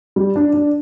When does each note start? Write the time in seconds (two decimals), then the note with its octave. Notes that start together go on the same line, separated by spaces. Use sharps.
0.16 G3
0.36 D4
0.53 D4